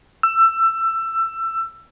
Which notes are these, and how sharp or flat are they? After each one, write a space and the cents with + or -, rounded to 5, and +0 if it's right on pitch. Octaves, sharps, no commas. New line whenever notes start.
E6 +20